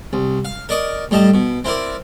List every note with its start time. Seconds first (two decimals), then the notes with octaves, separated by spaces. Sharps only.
0.13 C2
0.45 F5
0.69 A#4 D5 D#5 C#6 D#6
1.11 A2 G3 D#5 A5
1.34 B2
1.65 C4 E4 A#4 D5